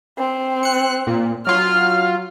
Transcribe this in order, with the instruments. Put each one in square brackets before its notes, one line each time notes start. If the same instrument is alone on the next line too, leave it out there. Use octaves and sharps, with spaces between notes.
[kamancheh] C4
[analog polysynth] F#6 C#7
A#2
[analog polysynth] F#3 F4 [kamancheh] F6